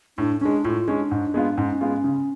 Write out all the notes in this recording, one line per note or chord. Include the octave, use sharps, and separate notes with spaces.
A2 D4
G#3 C#4 D4
A2 F4
G#3 C#4 D4
G#2
G#3 B3 F4
G#2 C#4
G#3 B3 F4
C#3